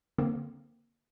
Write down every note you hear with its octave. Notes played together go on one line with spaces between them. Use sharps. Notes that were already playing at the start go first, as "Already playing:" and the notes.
D3 A#3 C4